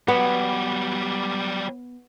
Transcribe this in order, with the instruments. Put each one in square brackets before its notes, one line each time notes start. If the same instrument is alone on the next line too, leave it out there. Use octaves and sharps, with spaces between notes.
[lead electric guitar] F#3 G3 [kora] B3